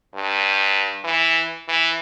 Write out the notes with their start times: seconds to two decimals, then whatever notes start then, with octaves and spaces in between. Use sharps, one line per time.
0.15 G2
1.04 E3
1.69 E3